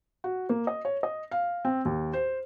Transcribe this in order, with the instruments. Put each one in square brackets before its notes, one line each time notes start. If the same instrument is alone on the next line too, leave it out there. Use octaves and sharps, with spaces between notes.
[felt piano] F#4
A#3
D#5
C#5
D#5
F5
C4
D#2
C5